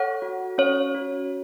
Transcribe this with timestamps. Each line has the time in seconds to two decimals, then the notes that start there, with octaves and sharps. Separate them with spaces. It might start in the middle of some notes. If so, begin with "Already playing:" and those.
Already playing: A4 C#5 F#5
0.22 F#4
0.58 C#4 C#5
0.94 F#4